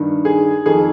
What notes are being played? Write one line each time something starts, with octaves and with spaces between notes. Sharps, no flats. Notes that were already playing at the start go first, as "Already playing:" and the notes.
Already playing: G2 D#3
G#4
F2 D#3 G#4